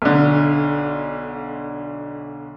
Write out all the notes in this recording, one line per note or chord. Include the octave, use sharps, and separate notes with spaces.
B1 D3